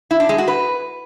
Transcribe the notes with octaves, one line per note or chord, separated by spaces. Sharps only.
E4
D4
G#3
F#4
B4